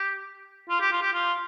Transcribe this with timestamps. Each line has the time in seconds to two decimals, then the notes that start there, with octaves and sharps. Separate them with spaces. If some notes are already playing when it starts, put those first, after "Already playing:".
Already playing: G4
0.69 F4
0.81 G4
0.92 F4
1.01 G4
1.13 F4